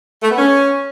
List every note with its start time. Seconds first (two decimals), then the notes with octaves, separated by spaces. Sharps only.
0.23 A3
0.30 B3
0.38 C#4